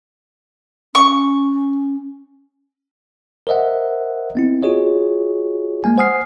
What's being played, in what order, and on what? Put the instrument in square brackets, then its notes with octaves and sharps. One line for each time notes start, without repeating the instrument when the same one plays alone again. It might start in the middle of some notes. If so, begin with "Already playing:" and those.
[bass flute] C#4 [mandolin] C#6
[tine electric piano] A#4 C5 D#5 E5 F#5
B3 C4 E4
F4 F#4 G#4 C#5 D#5
G#3 A#3 G#5
C5 F#5 G#5 D#6 F6 C7